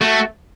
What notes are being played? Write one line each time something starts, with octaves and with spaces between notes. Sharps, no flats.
A3 F#4